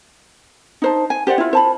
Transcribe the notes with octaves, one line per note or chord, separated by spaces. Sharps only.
D#4 C5 A5
G#5
G4 C5 D5 F#5
E4 F4
C5 A5 B5